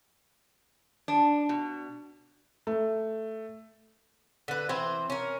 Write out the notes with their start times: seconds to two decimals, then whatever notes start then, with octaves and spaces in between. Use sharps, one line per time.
1.08 D4
1.49 B2
2.67 A3
4.48 D3 B4
4.69 E3 C4 C5
5.10 C#4 A#4